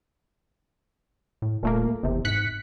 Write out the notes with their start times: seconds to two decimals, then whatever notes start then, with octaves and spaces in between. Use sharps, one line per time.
1.42 A2
1.63 D#1 A#2 A3 A#3
2.03 F#1 E2 C3
2.25 G#2 F#6 B6 C#7